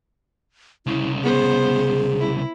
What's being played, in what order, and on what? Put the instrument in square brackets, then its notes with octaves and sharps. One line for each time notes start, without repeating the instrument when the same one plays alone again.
[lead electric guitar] C2 C#3 [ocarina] E4
[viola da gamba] B3 C5 [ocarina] G#4
[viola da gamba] E4